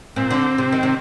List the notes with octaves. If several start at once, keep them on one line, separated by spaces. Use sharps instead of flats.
A#2 C4
D3
C3
D#3
C3